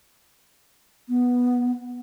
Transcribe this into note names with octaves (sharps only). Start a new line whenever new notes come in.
B3